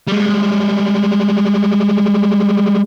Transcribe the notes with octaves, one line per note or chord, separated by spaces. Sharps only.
G3 G#3